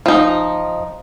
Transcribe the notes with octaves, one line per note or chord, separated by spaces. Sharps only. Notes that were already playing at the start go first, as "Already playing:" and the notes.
F3 D#4